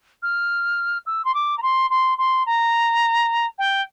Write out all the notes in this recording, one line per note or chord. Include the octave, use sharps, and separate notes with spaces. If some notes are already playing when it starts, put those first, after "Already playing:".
F6
E6
C6
D6
A#5
C6
C6
C6
A#5
G5